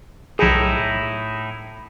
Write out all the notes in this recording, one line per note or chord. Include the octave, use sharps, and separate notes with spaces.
B1 A2 D#4 E4 G#4